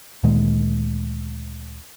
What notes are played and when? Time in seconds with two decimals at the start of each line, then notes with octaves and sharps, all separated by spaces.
0.23 D2 A#2 D#3 G#3